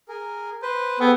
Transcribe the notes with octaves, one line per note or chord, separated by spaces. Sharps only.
G#4 A#4
B4 C5
B3 G#4 A4 G5